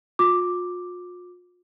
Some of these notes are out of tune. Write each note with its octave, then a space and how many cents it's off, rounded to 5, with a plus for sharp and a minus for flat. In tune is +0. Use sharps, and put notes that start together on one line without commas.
F4 +40 D6 +0